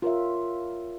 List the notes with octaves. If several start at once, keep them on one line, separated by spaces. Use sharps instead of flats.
F4 A#4 C#5 E5